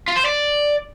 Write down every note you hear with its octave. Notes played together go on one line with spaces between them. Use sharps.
F4
C5
D5